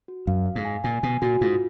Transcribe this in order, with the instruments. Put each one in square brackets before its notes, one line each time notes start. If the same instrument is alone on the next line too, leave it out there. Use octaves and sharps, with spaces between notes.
[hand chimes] F#4
[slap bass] F#2 [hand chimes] F5
[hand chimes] F5
[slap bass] G#2
[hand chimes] G#5
[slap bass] A#2 [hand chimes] G#5
[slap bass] B2 [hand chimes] G#5
[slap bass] A#2 [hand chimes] F#4
[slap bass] G#2 [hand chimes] F4